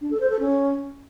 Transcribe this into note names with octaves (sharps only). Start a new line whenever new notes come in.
D4
A4
C5
A4
C#4